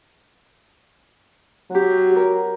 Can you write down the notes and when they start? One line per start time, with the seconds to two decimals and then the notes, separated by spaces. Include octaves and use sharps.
1.71 F#3 F#4 G4
2.13 G4 A#4